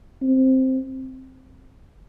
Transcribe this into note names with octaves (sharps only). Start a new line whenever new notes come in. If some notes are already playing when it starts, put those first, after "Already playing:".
C4